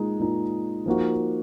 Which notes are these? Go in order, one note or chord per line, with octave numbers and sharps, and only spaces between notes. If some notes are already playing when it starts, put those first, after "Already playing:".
Already playing: A#2 G#3 D#4
A#2 G#3 D#4
F3 A#3 D#4 F#4